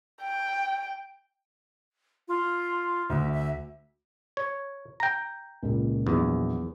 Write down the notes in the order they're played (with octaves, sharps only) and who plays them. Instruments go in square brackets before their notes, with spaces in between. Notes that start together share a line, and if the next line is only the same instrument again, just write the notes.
[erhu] G5
[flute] F4
[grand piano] D2 [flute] E5
[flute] E5
[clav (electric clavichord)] C#5
G5 A#5
[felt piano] C#2 A#2
[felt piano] A#1 F#3 [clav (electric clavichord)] E2